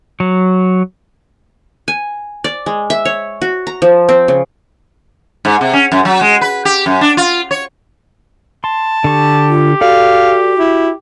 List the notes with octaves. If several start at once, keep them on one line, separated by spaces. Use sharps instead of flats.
F#3
G#5
D5
G#3
E5
C#5
F#4
A#5
F3
C4
C#3
G#2
C3
C#4
F#2
F#3
G#3
B4
G4
F#2
D4
F4
C#5
A5 C6
D3 G4 C#6
F4
F#4 A4 D5 F5
E4